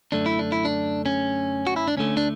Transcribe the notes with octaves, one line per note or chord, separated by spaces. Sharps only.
F#2 D3 A3 D4
E4
D4
E4
D4
C#4
F#4
E4
D4
D2 D3 A3 C#4
D4